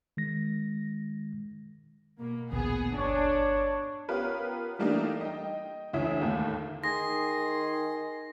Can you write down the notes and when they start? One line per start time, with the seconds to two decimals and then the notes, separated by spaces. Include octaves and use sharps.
0.17 D#3 G#3 A#6
2.20 B2 A#3
2.52 A1 D2 A#2 B3 G#4
2.95 G1 D4 C#5
4.09 B3 C#4 F4 G4 A#4 B4
4.79 E3 G3 A3 A#3 D4 D#4
5.21 D#5 G5
5.93 D2 E3 C#4 E4 E5 D#6
6.21 D#2 A2 D#3 A3 A#3
6.84 D#3 G#4 C6 A#6